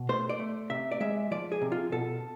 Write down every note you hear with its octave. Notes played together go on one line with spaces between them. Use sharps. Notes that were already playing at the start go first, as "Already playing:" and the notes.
Already playing: B2
A3 C5
D5
A3
C3 E5
D5
G#3 E5
F3 D5
G#4
C3
F4
B2 A4